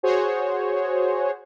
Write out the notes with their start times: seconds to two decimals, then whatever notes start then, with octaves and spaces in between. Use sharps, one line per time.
0.03 F#4 G#4 C5 C#5